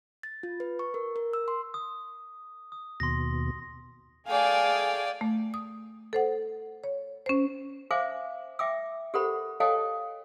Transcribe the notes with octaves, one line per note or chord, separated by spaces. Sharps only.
A6
F4
B4
C#6
A#4
A#4
E6
C6
D#6
D#6
D#2 B2 C6 A#6
A3 G#4 D5 F5 G5 G#5
A3
D#6
A4 C5 F#5
C#5
C#4 C5
C5 E5 F5 G#5 D6
E5 G5 D6 E6
G4 A4 A#4 C5 F#5 B5
A4 C#5 D#5 F5 G5 A5